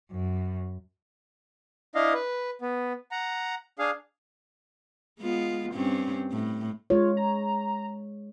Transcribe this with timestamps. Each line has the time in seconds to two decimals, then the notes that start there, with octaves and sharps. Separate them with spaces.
0.11 F#2
1.95 D4 E4 D#5 F5
2.13 B4
2.62 B3
3.11 F#5 A#5
3.79 D4 G#4 F5
5.20 G#3 B3 F4
5.73 G2 C4 C#4
6.32 A2
6.90 G#3 F4 C#5
7.17 A#5